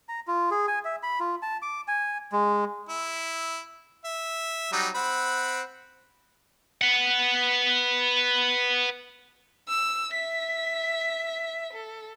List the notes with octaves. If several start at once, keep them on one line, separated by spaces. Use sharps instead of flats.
A#5
F4
G#4
G#5
E5
B5
F4
A5
D6
G#5
G#3
E4
E5
F#3 G3 D#4
C4 F#5 B5
B4 F#5
E6
E5 B6
A4